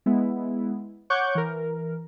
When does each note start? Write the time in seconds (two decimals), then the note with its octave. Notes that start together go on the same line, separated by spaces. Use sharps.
0.06 G#3 B3 E4
1.10 C#5 F#5 C#6 D6 F#6 G6
1.35 E3 A#4